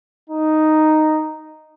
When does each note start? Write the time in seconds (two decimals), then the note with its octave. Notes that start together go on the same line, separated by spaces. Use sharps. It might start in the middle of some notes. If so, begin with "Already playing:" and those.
0.30 D#4